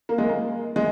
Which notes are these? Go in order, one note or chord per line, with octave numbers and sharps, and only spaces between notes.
A#3
G#3
A#3
G#3